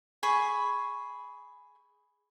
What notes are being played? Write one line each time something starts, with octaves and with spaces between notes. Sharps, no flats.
G#4 B5 C#6